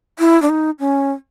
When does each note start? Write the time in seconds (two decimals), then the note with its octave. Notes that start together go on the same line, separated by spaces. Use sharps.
0.19 E4
0.42 D4
0.49 D#4
0.80 C#4